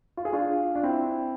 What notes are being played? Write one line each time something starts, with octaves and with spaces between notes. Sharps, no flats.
F4
G#4
D4 F4
D4
C4 E4